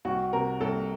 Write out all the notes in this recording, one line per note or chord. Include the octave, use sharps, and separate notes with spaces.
C2 F#4
C3 A#4
C2 A4